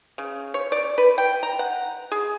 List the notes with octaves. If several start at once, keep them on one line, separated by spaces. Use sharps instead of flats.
C#3
C#5
D5
B4
G5
A#5
F#5
G#4